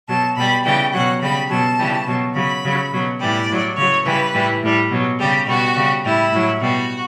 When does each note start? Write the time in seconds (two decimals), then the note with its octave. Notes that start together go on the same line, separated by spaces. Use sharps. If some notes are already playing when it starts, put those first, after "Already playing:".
0.08 B2 F#3 A5
0.37 B2 G3 B5
0.65 C#3 E3 G3 G5
0.93 B2 F#3 F#5
1.22 C#3 G3 B5
1.50 B2 F#3 A5
1.78 C#3 E3 G3
2.07 B2 F#3
2.35 C#3 F#3 B5
2.64 C#3 F#3
2.92 B2 F#3
3.20 A2 E3 G3 D5
3.49 A2 F#3
3.77 C#3 F#3 C#5
4.05 C#3 E3 G3 B4
4.34 A2 E3 G3
4.63 A2 G3
4.91 B2 F#3
5.19 C#3 G3 G4
5.47 B2 G3 F#4
5.76 C#3 G3
6.04 A2 G3 E4
6.32 A2 F#3
6.61 B2 G3 F#4